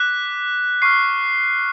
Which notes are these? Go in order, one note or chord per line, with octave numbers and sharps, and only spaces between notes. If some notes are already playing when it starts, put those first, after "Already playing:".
Already playing: D6 F#6 B6
C#6 F6 C7